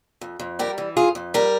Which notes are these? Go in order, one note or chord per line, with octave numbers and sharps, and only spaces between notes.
F2
F2
G3 G4 A#4
E3
F2 F4 G#4
F2
G3 G4 A#4